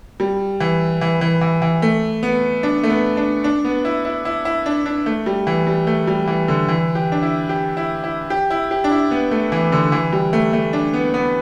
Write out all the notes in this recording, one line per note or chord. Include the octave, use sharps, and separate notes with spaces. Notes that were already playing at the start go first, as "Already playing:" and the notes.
G3
E3
E3
E3
E3
E3
A3
B3
D4
A3
B3
D4
D4
B3
E4
E4
E4
E4
D4
D4
A3
G3
E3
G3
A3
G3
E3
D3
E3
G4
D4
E4
G4
E4
E4
G4
E4
G4
D4
E4
B3
A3
E3
D3
E3
G3
A3
A3
D4
B3
B3